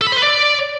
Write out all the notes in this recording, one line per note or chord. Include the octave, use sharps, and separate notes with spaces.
A4
B5
C5
B4
D5